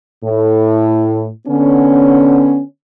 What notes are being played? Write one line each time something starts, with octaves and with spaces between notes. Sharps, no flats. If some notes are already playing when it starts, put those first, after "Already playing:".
A2
D3 B3 C#4